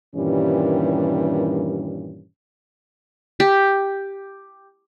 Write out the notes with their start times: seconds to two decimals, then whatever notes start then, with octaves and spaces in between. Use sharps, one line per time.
0.15 G2 A#2 D#3 E3 G3 C#4
3.40 G4